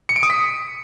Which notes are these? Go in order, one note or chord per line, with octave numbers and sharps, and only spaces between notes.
C#7
D7
D#6
B6